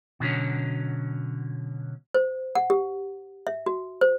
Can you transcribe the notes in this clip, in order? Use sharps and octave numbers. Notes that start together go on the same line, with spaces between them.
B2 D3 F#3 C#4
C5
F#5
G4
E5
F#4
C5